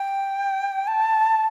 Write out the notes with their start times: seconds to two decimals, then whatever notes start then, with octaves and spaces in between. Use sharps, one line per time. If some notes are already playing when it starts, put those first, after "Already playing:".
Already playing: G5
0.87 A5